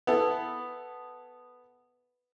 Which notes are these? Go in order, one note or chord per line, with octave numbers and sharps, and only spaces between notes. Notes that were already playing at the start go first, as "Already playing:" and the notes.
B3 E4 A4